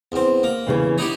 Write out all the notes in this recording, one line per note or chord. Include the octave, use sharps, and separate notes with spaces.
E2 C4
A#3
E2 C#3 E3
D#4 E4 G4